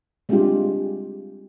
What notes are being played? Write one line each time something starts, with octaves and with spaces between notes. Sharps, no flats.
G3 G#3 C4 D4 F4 G4